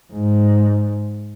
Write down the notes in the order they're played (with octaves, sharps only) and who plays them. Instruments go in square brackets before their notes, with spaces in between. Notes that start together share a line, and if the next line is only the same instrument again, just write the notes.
[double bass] G#2